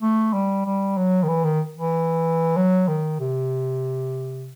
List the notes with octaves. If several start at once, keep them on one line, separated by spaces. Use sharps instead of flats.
A3
G3
G3
F#3
D#3
E3
D#3
E3
F#3
D#3
C3